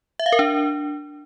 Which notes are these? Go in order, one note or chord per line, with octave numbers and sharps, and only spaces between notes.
E5
F5
A#4
D4